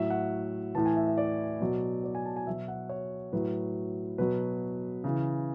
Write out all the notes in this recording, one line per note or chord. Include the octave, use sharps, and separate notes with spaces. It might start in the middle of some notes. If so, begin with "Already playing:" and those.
Already playing: A2 F#3 E5
F#5
A2 E3 A5
G#5
E5
E5
D5
B2 F#3
D5
G#5
A5
G#5
B2 F#3 E5
F#5
C#5
A2 F#3 B4
B2 F#3 B4
C#3 E3